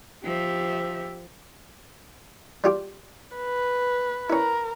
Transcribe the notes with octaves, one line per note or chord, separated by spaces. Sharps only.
F3 G4 E5
G3 F4 G4
B4
C#4 E4 A#4